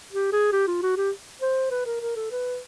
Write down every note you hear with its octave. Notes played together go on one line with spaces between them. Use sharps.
G4
G#4
G4
F4
F#4
G4
C5
B4
A#4
A#4
A4
B4